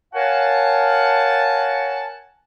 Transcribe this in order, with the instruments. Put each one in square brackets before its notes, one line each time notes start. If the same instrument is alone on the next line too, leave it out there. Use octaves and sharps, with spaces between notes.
[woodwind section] A#4 C#5 F5 F#5 G#5 A5